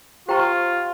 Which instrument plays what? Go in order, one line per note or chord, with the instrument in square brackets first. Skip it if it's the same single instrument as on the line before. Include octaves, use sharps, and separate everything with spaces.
[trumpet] F4 [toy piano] G4 C5 G5 A#5 C#6